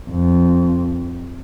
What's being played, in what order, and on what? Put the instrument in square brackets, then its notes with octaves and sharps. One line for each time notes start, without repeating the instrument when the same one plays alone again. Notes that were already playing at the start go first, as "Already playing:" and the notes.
[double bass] F2